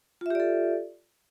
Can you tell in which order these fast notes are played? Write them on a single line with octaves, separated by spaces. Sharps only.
F4 E5 G4 D5 A4